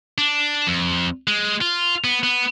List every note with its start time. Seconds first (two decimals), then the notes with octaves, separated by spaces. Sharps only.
0.18 D4
0.67 F2
1.27 G#3
1.61 F4
2.04 B3
2.23 B3